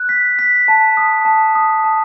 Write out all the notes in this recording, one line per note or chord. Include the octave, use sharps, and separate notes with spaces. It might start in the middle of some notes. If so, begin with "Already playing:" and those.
Already playing: F#6
B6
B6
A5
D#6
A5
D#6
A5